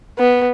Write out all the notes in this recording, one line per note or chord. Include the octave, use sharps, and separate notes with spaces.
B3